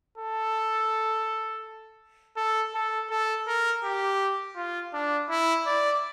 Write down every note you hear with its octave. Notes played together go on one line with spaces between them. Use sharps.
A4
A4
A4
A4
A#4
G4
F4
D4
E4
D5